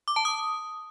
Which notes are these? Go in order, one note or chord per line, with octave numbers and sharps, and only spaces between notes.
D6
A5
D#6